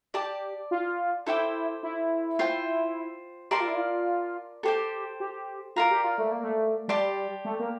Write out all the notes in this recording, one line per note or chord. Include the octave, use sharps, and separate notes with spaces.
G4 D5 A5 D6
F4
E4 A4 C5 G5 D6
E4
F4 C5 G5
G4 A#4 D5 A5 C6
F4
E4
F4
G4 A4 C5 G5
G4
F4 A#4 D5 F5 A#5
G4
F4
A3
A#3
A3
G3 G4 D5 A5 C6
A3
A#3